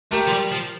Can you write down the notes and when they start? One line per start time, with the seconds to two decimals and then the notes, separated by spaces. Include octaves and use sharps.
0.12 A3 G4 A#4
0.27 F3
0.31 G3
0.51 F3